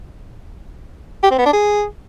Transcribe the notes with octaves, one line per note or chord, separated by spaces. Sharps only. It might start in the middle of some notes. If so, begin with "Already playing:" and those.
G4
C4
B3
D4
G#4